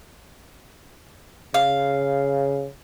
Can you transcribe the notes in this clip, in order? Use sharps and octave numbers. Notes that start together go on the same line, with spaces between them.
C#3 F5